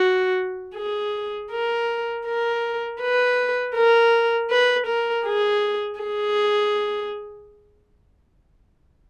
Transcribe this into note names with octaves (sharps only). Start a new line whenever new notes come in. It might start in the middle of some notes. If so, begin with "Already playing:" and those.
Already playing: F#4
G#4
A#4
A#4
B4
A#4
B4
A#4
G#4
G#4